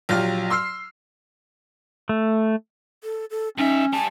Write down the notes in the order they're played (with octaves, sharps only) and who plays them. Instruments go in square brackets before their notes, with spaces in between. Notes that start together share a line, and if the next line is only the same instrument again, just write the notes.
[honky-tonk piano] A#1 F#3 F4 G4 F6
C6 E6 F6 C7
[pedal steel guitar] A3
[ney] A4
A4
[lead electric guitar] G2 E5 [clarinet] C#4 [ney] D#4
[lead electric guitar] G3 A5 [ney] G#5